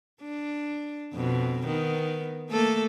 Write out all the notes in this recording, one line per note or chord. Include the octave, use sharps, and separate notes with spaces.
D4
F2 B2
D#3 B3
A3 A#3 A4